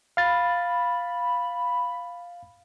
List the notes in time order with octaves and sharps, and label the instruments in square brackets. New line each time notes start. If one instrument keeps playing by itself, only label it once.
[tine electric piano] F5 A6 [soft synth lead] B5